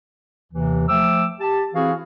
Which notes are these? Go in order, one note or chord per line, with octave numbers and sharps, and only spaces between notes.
D#2 C3 E3
F3 A3 G5 D6 E6
G4 A5
E3 C4 E4 F#4 G#4 F5